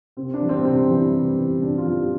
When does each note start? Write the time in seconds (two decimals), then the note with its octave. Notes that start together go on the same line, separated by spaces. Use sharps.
0.17 C3 C4
0.34 D4
0.41 E3 G3
0.49 C4
0.65 C3 C4
0.90 E3 G3
1.14 C3
1.37 E3 G3
1.62 C3 D4
1.78 F4
1.87 E3 G3
1.94 G4